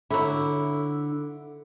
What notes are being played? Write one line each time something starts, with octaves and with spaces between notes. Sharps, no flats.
D3 F#3 E4